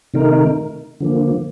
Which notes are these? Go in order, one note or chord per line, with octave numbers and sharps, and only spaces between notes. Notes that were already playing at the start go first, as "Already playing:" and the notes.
C3 D#3 A3 D#4 A#4
D3 F3 A#3